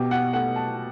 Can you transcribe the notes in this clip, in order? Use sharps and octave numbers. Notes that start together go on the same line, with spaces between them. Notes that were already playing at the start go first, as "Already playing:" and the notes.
Already playing: B2 G4
F#5
A3 F#5
A5